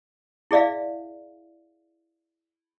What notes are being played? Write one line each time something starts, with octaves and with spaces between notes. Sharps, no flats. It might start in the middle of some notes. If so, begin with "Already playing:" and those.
E4 G#4 D5 E5 F5